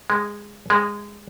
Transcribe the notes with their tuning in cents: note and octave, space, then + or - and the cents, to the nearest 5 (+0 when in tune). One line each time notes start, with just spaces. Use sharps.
G#3 -10
G#3 -15